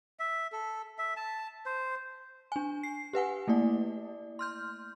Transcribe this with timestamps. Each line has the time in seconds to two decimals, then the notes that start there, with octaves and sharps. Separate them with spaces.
0.19 E5
0.52 A4
0.98 E5
1.17 A5
1.66 C5
2.52 D4 G#5
2.83 C7
3.13 G4 B4 F#5 G#5
3.48 A3 A#3 E4 D5
4.39 C6 F6 G6